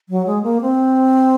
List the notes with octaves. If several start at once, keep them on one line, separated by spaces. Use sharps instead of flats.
F#3
G#3
A#3
C4